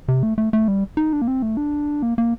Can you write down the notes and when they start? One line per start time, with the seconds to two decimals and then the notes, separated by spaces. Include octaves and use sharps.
0.08 C3
0.23 A3
0.38 A3
0.53 A3
0.68 G3
0.97 D#4
1.13 D4
1.22 A#3
1.28 C4
1.42 A3
1.57 D4
2.02 A#3
2.18 A#3